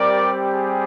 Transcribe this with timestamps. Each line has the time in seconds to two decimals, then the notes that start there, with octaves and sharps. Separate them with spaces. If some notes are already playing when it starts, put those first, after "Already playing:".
Already playing: G3 C4 G4 A#4 D5
0.53 G#4